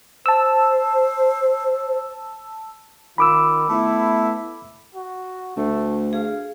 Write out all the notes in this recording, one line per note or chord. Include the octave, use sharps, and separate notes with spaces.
C5 A5 E6
D#3 F4 B5 D6 E6
A3 B3 E4
F#4
D2 A3
G#4 F5